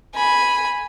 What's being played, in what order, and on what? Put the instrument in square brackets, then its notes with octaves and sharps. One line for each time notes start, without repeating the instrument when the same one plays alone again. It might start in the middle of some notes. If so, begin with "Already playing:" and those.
[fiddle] G#5 B5